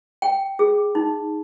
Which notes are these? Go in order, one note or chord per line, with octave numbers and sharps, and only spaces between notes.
G5
G#4
D#4